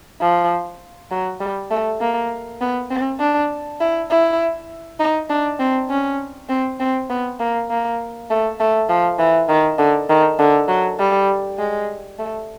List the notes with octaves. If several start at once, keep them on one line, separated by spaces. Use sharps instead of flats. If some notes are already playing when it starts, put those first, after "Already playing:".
F3
F#3
G3
A3
A#3
B3
C4
D4
E4
E4
D#4
D4
C4
C#4
C4
C4
B3
A#3
A#3
A3
A3
F3
E3
D#3
D3
D#3
D3
F#3
G3
G#3
A3